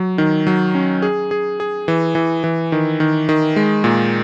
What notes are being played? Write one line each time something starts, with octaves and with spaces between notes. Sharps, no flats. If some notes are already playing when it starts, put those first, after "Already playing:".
Already playing: F#3
D#3
F#3
C#4
G#4
G#4
G#4
E3
E3
E3
D#3
D#3
D#3
G#3
A#2